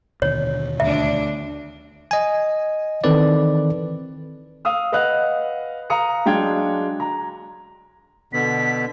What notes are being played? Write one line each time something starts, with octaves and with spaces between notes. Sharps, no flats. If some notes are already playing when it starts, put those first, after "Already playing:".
D#2 B2 D3 C#5
D2 D4 E5
D#5 G#5
D#3 E3 C4 A4 B4 D5
F5 D#6 E6
B4 D#5 F5 F#5 F#6
F5 A#5 D#6 C#7
F#3 G#3 D4 F5 G5 G#6
A#5
B2 D3 B3 B6